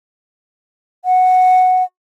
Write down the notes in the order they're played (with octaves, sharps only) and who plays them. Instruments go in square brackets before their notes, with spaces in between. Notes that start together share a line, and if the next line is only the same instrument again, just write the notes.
[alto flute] F#5